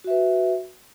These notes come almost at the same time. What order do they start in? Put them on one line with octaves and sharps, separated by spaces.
F#4 E5 B4